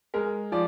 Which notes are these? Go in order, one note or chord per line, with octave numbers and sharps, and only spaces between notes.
G#3 A#4
F3 D5